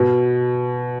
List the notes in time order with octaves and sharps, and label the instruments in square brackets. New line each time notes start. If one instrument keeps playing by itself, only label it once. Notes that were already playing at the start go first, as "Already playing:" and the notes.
Already playing: [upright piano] B2